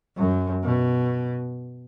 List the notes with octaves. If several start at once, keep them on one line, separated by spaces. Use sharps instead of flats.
F#2
B2